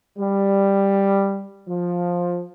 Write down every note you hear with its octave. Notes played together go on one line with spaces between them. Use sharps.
G3
F3